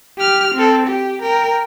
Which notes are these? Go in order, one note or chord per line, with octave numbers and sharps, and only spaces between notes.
G4 F6
C4 A4
G4
A#4 G5